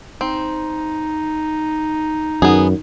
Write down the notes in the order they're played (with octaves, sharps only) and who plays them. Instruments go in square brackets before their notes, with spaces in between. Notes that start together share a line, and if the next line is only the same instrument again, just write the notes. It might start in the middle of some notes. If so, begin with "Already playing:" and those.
[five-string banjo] C4 [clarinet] D#4
[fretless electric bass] F#2 [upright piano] D#3 [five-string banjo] B3 G#4